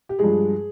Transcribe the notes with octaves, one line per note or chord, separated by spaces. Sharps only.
G4
G2 F3 G#3 G#4